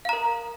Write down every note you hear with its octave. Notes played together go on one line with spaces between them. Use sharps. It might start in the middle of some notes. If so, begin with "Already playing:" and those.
A#4 F5 A#5